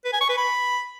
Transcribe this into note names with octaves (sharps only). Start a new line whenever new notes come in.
B4
G#5
C#6
B4
B5